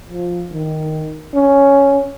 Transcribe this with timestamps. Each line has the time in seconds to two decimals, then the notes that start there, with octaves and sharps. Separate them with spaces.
0.10 F3
0.53 D#3
1.34 C#4